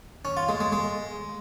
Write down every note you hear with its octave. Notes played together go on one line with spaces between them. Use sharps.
C#4
F4
G#3
G#3
G#3